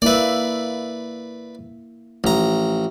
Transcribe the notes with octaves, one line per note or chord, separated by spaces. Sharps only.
A#3 E4 B4 D5 E5
A1 F3 A#5